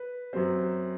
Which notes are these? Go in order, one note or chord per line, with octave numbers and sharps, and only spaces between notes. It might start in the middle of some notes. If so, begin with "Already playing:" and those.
Already playing: B4
F#2 F#3 C4